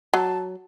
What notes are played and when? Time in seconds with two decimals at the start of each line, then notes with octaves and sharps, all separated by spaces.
0.14 F#3 A5